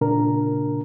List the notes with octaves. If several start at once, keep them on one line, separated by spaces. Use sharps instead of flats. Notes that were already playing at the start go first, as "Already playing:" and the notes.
A#2 C#3 D4 A#4 A#5